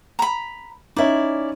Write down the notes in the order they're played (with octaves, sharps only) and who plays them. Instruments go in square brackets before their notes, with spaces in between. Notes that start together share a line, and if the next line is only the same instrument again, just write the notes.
[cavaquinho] A#5 B5
[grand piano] C#4 D#4 [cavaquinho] E4 D5